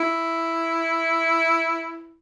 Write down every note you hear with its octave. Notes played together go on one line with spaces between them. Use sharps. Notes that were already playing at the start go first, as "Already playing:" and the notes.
Already playing: E4